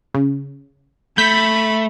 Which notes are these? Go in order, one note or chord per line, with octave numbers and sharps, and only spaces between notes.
C#3
A3 B5 G6 B6